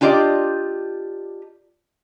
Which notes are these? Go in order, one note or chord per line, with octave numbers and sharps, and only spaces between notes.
D4 F4 G4 D5 D#5